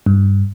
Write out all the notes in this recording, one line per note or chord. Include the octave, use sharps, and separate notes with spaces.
G2